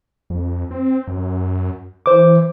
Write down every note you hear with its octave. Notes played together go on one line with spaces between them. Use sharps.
F2
C4
F#2
E3 C5 D6